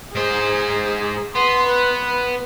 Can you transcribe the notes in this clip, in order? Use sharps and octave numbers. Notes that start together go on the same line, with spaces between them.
G#2 G#4 C5
B3 C6
B4